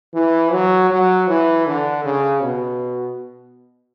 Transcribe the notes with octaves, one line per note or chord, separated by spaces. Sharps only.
E3
F#3
F#3
E3
D3
C#3
B2